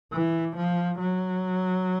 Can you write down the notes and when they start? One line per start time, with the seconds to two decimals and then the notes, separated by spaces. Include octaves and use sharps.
0.13 E3
0.56 F3
0.99 F#3